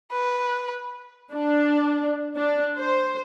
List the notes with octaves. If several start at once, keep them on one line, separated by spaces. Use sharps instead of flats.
B4
D4
D4
C5